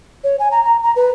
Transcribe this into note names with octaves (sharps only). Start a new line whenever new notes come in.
C#5
G#5
A#5
A#5
A#5
B4